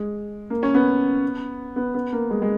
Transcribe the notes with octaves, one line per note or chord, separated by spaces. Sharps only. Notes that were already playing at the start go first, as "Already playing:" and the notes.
Already playing: G#3
A#3
C#4
B3
B3
B3
A#3
G#3
G#3